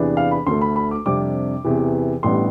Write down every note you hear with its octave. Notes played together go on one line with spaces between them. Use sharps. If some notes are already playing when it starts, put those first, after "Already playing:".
Already playing: E2 C3 E3 B3 D4
F5
B5
D2 D3 A3 C6
B5
B5
D6
F2 C3 G3 D4 D6
E2 C3 E3
A1 A2 G3 B3 D4 C6